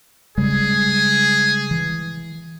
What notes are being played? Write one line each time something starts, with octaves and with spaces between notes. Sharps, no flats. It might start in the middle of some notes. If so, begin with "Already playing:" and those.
C#3 G3 G#3 G#4
E3